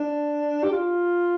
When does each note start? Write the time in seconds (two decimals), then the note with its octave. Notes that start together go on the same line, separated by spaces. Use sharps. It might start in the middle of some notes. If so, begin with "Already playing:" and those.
Already playing: D4
0.64 G4
0.73 F4